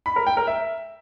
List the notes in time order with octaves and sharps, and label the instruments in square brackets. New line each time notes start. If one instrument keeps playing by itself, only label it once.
[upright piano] B5
A#4
G5
A#4
E5